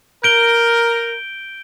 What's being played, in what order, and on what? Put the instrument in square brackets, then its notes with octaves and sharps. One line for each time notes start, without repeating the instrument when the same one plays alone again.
[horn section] A#4 [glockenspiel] G6 D7 G7